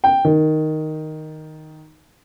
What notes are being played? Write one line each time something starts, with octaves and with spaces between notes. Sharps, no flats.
G5
D#3